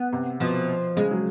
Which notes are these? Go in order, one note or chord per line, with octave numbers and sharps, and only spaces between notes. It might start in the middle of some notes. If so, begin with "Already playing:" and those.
Already playing: B3
C3
B2 F3
C#3 G#3
F#3